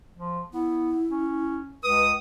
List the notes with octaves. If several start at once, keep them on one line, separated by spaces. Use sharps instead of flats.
F3
B3 E4
C#4
C#2 B4 D#6